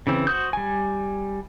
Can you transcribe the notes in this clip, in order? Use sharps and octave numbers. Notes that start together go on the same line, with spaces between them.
C#3 E3 C4
F#4 C5 D#6 G6
G3 G#5